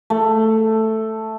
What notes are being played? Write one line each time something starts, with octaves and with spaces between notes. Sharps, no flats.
A3